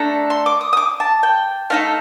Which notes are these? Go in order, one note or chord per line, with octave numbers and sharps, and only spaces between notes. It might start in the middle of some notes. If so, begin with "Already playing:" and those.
Already playing: A3 D4 A4 A#5
C6
D6
D#6
D#6
D6
A5
G5
A3 D#4 A4 F5